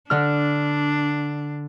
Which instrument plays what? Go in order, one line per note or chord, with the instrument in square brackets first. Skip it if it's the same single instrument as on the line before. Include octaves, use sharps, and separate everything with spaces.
[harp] D3 F6 [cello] D4